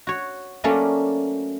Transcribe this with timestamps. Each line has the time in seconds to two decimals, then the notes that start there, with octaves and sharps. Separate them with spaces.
0.07 F#4 C#5
0.64 F#3 A3 A#3 C#4 A4 D5